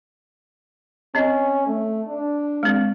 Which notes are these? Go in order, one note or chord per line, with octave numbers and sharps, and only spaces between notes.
C4 C#4 D#5
A3
D4
G#3 C4